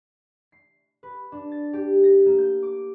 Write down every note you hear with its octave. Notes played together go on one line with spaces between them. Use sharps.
C7
B4
D4
A6
G4
A#6
A#3
G6
D6